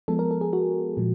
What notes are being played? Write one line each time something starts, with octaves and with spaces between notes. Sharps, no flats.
F3 G#3 B3 A4
A#4
A4
G#4
F#4
A#2 F3 G#3